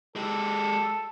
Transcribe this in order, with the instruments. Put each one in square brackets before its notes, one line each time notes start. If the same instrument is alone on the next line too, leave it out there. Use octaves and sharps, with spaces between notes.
[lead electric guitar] G#3 G4 [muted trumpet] A4